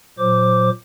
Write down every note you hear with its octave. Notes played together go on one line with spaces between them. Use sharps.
A#2 F#3 C5 D6